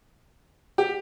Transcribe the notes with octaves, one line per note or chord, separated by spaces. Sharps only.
G4